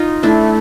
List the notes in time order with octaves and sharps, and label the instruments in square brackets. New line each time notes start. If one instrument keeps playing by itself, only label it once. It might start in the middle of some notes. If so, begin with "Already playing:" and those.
Already playing: [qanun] D#4 F4
[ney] A3 [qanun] D4 E4